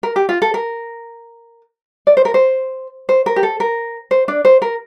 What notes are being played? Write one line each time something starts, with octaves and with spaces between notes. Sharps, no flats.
A#4
G4
F4
A4
A#4
D5
C5
A#4
C5
C5
A#4
G4
A4
A#4
C5
D4 D5
C5
A#4